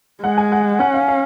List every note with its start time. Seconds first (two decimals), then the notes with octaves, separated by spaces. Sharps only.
0.23 G#3 F#5
0.38 G#5
0.52 F#5
0.80 C#4 F#5
0.94 F5
1.08 F5